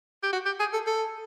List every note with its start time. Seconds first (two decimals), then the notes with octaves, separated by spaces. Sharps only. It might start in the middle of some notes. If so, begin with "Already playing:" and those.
0.23 G4
0.33 F#4
0.46 G4
0.60 G#4
0.73 A4
0.87 A4